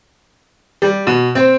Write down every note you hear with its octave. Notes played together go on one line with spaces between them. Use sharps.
G3
B2
C4